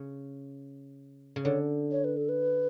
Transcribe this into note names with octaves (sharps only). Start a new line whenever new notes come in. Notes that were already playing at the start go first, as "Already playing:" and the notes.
Already playing: C#3
C#3
D3 C#5
C#5
B4
A4
B4